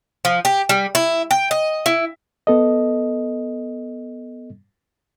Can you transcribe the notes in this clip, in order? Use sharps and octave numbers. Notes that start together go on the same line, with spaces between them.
F3
G4
G3
E4
G5
D#5
E4
B3 A4 D#5